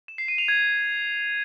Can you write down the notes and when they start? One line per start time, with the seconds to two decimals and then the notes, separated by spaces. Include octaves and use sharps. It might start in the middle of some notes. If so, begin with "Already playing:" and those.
0.08 E7
0.18 C7
0.28 D#7
0.38 F7
0.48 G#6